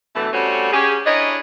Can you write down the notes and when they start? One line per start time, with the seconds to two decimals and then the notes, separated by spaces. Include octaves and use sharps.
0.15 B2 D3 E3 A3
0.33 G3 A3 C4 C#4 F#4 A4
0.72 C#4 G4 G#4
1.06 D4 E4 A#4 C#5 D#5